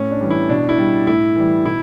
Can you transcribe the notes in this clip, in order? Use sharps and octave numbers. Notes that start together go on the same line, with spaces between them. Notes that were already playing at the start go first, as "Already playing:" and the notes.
Already playing: A2 C#4
D4
E3 G3
E4
B2 D4
E4
G3
A2 E4
E3 G3
B2 E4